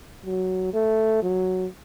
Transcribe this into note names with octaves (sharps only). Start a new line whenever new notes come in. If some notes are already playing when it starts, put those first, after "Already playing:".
F#3
A3
F#3